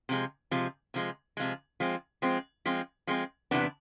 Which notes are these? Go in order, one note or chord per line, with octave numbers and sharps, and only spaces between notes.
C3 F3 G#3
C3 F3 G#3
C3 F3 G#3
C3 F3 G#3
F3 G#3 C4
F3 G#3 C4
F3 G#3 C4
F3 G#3 C4
E2 C3 E3 B3 D4